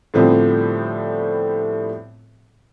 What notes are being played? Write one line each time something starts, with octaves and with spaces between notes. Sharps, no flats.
A2 D3 F3 G3 B3 C4